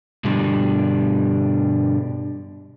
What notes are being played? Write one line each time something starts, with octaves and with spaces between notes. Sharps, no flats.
G2 B2 D3 G3